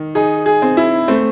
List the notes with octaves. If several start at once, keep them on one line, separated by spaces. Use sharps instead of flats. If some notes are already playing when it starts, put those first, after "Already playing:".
Already playing: D#3
D#4 G#4
G#4
C4
E4
A3 C4